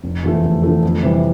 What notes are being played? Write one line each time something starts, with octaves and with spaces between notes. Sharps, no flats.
F1
E2 D3 F3 A3
F1
E2 D3 F3 A3
F2
C3 E3 G3